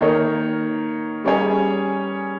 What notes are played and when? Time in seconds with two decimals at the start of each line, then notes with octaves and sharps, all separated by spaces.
0.01 D#3 A#3 D#4 A#4 C#5
1.24 G3 C#4 G#4 C#5